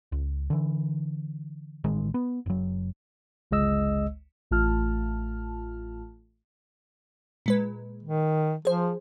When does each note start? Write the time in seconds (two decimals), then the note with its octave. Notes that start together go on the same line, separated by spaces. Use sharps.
0.12 C#2
0.50 D3 E3
1.84 A1 D#3 G#3
2.14 B3
2.46 F#1 F#3
3.51 G1 C#2 G#3 D#5 E6
4.51 A1 A3 F4 A5 F6
7.46 A#2 G#3 B4
8.03 D#3
8.65 F3 G#4 C5